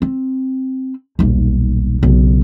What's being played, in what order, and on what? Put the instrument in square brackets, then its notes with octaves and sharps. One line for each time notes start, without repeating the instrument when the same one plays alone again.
[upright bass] C4
D#1 B1
B1 C#3